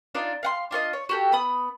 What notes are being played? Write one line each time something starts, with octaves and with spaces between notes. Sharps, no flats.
D4 D#4 F4 D5
F5 F#5 C6
D4 F4 C#5 D#5
C#5
F#4 G4 A4
B3 B5 D#6